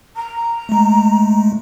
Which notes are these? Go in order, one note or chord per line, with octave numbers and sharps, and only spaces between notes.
A#5
G#3 A3